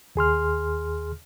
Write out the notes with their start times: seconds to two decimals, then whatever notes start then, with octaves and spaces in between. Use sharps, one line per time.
0.16 D#2 G#4 C6 F6